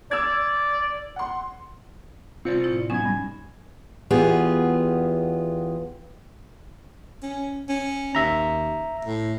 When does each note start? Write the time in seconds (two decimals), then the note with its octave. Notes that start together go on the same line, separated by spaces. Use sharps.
0.11 D5 E6 G#6
1.16 F#5 C6
2.45 C3 C4 F4 C5 D5 C#7
2.64 A2 E4
2.90 F#3 B3 C#4 D#4 G#5 G#6
3.05 G2 G3
4.10 E2 B3 F4 G4 G#4
7.23 C#4
7.69 C#4
8.15 D#2 E5 A#5
9.05 A2